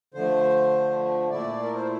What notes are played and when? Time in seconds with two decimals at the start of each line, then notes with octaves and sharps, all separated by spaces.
0.14 D3 F3 A3 C5
1.30 A#2 A3 E4 D5
1.63 A#4
1.75 C5